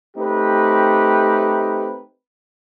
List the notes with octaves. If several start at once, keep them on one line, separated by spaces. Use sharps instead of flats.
A3 C4 D#4 G4 B4